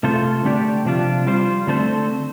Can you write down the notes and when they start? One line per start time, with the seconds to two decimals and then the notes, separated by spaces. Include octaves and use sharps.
0.03 C3 A3 F4 A4 C5
0.44 D3 A3 D4 G4 D5
0.85 C3 F3 D4 F4
1.27 G3 F4 C5
1.67 D3 A3 C4 A4 C5